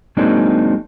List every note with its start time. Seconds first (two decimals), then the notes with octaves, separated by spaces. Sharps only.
0.17 F#3 G#3 A#3 C4 D4 D#4